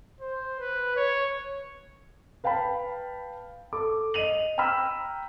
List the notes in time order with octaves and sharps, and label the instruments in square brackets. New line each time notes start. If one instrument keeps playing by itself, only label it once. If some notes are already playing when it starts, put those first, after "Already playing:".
[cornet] C5
B4
C#5
[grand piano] B4 F5 G5 A5 B5
A4 D6
D#5 D#7 F7 F#7
G5 A#5 B5 E6 F6